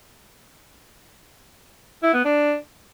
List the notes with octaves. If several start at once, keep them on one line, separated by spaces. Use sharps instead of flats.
E4
B3
D4